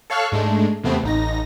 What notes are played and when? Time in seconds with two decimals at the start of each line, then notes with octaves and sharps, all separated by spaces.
0.10 A4 C#5 F5 C#6 E6 F#6
0.32 G#2 G#3 A3 D4
0.84 E2 C3 A3 B3 C4
1.03 A1 D#4 A#6